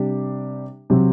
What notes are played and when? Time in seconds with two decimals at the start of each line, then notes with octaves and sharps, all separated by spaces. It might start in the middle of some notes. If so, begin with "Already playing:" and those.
Already playing: C3 G3 D4 G4
0.90 C3 F#3 C4